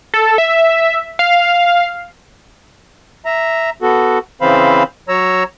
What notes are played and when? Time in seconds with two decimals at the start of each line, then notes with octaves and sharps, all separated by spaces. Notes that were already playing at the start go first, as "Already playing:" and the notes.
0.14 A4
0.38 E5
1.19 F5
3.25 E5 A#5
3.82 B3 F#4 A4
4.41 C#3 E3 C4 C5 F5 B5
5.08 F#3 C#5 A#5 E6